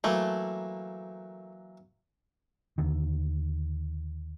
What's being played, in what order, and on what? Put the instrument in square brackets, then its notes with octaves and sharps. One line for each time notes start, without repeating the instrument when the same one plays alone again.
[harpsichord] E3 F#3 A#3 [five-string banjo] A3
[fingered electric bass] D#2 D3 D#3